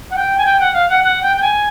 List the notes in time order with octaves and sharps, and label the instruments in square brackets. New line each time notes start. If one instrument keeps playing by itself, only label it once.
[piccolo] F#5
G5
G#5
G5
F#5
F5
F#5
F#5
G5
G5
G#5